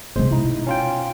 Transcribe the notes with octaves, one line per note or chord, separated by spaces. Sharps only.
C3 G#3 B3 C5
B2 D#4 E4
C#4 F4 G5